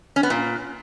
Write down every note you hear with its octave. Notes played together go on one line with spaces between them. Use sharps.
C#4
B3
A#2